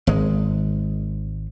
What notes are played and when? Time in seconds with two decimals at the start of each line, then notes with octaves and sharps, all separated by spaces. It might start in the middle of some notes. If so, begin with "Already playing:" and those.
0.07 G#1 G#3